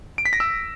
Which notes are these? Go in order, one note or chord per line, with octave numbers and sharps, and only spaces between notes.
D7
B6
A#6
E6